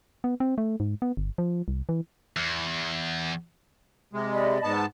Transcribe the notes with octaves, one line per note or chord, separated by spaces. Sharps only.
B3
C4
A3
G#2
B3
G1
F3
C2
E3
E2
C3 G#3
D5 D#5 B5
G#2 B3 A5